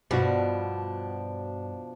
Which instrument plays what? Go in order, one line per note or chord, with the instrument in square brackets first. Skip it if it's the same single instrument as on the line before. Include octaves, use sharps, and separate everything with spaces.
[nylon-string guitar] G2 F#4 [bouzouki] B2 F3 D4